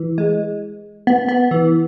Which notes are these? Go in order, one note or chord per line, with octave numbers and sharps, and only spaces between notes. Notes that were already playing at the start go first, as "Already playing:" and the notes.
Already playing: E3
G#3
B3
B3
E3